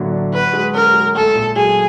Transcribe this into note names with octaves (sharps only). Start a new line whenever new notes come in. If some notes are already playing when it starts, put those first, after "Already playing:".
Already playing: A2 D3 F#3 A#3
D4
F#4 B4
G#3
C#4 A#4
G#3
A3 A4
A#2
F#3 G#4